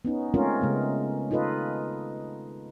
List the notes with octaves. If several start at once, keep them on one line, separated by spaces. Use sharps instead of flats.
B3 C#4 D#4
G#3 A3 C4 C#4 F4 A#4
C#3 G#3 A3 B3
D#4 F4 A4 B4 D#5